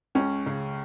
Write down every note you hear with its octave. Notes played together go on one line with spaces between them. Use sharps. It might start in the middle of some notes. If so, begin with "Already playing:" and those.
C#2 C#4
C#3